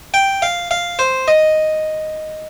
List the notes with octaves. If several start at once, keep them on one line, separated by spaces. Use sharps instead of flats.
G5
F5
F5
C5
D#5